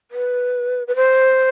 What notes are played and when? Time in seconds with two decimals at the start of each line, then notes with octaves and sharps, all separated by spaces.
0.11 B4
0.87 B4
0.96 C5